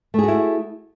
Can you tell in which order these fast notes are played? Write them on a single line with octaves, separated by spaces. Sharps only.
A3 G#4 F#4 E4